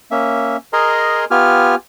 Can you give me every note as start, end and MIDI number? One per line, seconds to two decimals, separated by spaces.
0.11 0.57 58
0.11 0.57 61
0.11 0.57 76
0.73 1.25 68
0.73 1.25 70
0.73 1.25 75
0.73 1.25 80
0.73 1.25 82
0.73 1.25 84
1.31 1.75 59
1.31 1.75 65
1.31 1.75 67
1.31 1.75 80
1.31 1.75 89